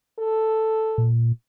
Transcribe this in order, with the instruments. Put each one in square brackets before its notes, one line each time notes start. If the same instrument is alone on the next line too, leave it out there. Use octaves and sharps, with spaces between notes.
[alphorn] A4
[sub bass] A#2